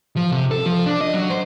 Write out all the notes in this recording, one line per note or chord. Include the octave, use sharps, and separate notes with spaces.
F3
C3
A4
F3
D4
D#5
F#3
C5